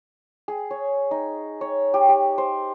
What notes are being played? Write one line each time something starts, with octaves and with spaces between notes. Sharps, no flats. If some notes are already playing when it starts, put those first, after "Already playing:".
G#4
C#5
D#4
C#5
G4
G4
C5